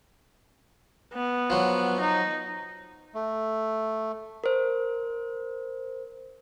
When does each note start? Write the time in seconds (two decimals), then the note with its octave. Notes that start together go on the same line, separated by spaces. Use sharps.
1.14 B3
1.50 F3 F#3
2.00 D#4
3.15 A3
4.44 A#4 C5